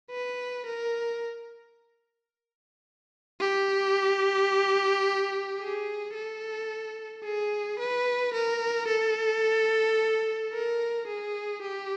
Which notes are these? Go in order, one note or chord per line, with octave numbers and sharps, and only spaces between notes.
B4
A#4
G4
G#4
A4
G#4
B4
A#4
A4
A#4
G#4
G4